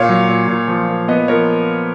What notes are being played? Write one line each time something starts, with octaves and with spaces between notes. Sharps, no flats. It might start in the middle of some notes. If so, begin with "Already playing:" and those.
Already playing: A#2 C#5 F5
F#3
A#2
A#2
F3
A#2
B3 B4 D#5
F3 A#4 C#5